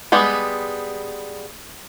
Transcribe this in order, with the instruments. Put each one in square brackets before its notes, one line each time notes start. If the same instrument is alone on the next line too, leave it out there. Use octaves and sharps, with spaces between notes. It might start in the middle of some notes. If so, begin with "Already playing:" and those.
[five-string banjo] G3 G#3 B3